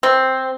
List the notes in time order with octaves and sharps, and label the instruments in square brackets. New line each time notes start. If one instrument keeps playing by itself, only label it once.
[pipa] C4